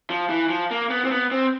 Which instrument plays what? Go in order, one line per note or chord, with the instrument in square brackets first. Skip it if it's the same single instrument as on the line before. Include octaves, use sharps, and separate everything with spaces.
[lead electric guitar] F3
E3
F3
A#3
B3
C4
B3
C4